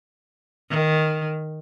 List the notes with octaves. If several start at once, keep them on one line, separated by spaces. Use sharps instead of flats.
D#3